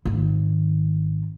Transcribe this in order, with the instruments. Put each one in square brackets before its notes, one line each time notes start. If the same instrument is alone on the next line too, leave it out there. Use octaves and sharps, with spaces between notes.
[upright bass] G#1 D#3